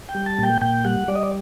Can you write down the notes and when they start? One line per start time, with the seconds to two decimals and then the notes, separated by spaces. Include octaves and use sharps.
0.09 G5
0.15 G3
0.26 A5
0.39 A#2 G5
0.61 A#2 G5
0.85 G3 F#5
1.08 G3 D5
1.15 D#5
1.23 D5